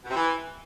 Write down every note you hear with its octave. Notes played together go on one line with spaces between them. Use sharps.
B2
C3
E3